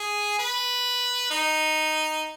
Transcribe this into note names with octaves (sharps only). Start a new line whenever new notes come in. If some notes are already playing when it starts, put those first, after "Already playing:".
Already playing: G#4
B4
D#4